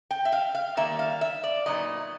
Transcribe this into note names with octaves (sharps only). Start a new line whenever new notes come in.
G5
E5
F5
F5
D#3 G3 A#3 E5
F5
E5
D5
A#2 F#3 B3 D#4 D#5